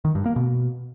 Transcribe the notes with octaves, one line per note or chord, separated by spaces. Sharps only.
D#3
G2
A#3
B2